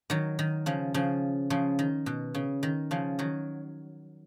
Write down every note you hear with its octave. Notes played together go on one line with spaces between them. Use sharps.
D#3 F#3
D#3
C#3 F3
C#3 F3
C#3 F3
D#3
B2
C#3
D#3
C#3 F3
D#3 F#3